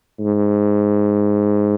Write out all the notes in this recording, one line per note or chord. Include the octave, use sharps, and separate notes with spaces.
G#2